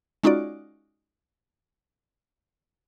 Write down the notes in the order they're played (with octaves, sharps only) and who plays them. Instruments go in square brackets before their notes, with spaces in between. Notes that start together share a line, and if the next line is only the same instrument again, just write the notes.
[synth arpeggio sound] G#3 C#4 D#4 F4 F#4 D5